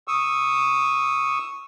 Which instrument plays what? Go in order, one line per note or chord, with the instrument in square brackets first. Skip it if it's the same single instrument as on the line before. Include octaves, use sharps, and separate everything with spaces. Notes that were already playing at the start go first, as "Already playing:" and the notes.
[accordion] C#6 D#6 E6